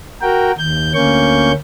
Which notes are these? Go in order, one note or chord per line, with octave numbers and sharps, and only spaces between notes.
F#4 A#4 G5
D#2 G6
D2 A#3 C#4 C#6 G6